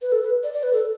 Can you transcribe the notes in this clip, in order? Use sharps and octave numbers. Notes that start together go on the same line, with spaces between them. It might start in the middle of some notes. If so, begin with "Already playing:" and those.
B4
A4
B4
D5
D5
B4
A4